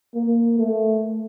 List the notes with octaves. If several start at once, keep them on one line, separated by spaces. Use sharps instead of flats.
A#3
A3